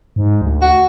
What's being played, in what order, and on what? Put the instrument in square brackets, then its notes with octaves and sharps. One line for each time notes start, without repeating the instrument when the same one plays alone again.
[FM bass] G#2
D2
[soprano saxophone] F#4